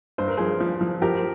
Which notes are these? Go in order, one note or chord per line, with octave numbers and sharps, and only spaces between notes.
G2 C5
A#4
F3 G#4 C5
F3
F3
F3 G4 A#4